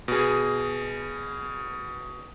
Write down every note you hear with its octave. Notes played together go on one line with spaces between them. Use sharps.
B2 G#4